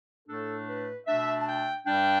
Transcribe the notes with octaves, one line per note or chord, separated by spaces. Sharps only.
A2 A3 D4 A4
B4
B2 A3 D4 E5
A5
G5
G2 G3 D4 G5